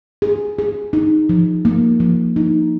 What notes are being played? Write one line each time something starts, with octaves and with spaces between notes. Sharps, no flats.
G#4
G#4
D#4
F3
A#3
F3
D#4